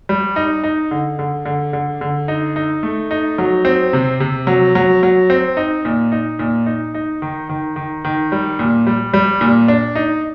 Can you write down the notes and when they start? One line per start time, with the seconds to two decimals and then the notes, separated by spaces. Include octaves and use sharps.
0.09 G3
0.36 D#4
0.63 D#4
0.91 D3
1.19 D3
1.45 D3
1.73 D3
2.01 D3
2.28 D#4
2.56 D#4
2.83 A3
3.11 D#4
3.38 F#3
3.65 C4
3.93 C3
4.20 C3
4.47 F#3
4.75 F#3
5.03 F#3
5.30 C4
5.57 D#4
5.85 A#2
6.12 D#4
6.39 A#2
6.66 D#4
6.94 D#4
7.22 D#3
7.49 D#3
7.76 D#3
8.05 D#3
8.32 G3
8.59 A#2
8.87 G3
9.14 G3
9.41 A#2
9.68 D4
9.95 D#4